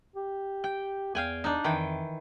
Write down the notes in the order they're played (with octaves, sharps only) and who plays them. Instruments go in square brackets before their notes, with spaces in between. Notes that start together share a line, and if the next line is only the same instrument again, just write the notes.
[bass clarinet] G4
[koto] G5
[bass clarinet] E2 [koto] F5 G5 G#5
[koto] D4 D#4
[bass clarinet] F2 [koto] D#3 E3 G5